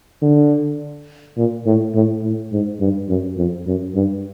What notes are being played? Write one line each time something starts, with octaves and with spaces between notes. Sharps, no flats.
D3
A#2
A2
A2
A2
G#2
G2
F#2
F2
F#2
G2